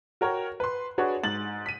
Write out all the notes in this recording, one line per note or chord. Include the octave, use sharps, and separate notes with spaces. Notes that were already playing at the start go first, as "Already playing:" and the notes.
F#4 A#4 C#5 G5
B4 C6
D4 F#4 G#4 B4 C#5 D5
G#2 A6 F#7
B6 D#7